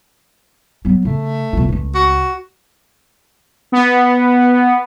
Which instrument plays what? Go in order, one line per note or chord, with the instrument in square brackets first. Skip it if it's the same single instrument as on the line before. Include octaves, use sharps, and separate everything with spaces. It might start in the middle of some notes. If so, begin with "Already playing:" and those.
[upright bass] F#3 B3
[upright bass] C#3 [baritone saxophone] A3
[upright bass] B1 F4
C#2 A3
[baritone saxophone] F#4
[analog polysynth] B3